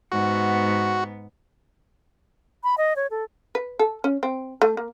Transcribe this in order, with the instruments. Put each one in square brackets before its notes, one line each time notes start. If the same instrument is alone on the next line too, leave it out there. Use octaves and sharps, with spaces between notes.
[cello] G#2 B3 [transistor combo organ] F#4
[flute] B5
D#5
C#5
A4
[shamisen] B4
A4
C#4
C4
A3
A#3